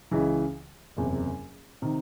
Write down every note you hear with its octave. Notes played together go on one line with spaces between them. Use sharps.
C#2 C#3 E3
F#1 E2 C3
C3 D#3